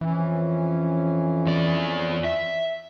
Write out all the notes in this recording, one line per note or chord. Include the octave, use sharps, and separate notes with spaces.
F2 E3 C#4
E2 D5
E5